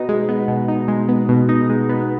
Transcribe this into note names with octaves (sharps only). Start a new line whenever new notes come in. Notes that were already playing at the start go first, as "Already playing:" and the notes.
Already playing: B2 B3 D#4
G#3
B3
B2
D#4
G#3
B3
B2
D#4
G#3
B3